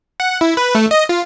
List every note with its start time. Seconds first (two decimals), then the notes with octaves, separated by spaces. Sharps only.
0.20 F#5
0.41 E4
0.57 B4
0.75 A3
0.91 D#5
1.09 F4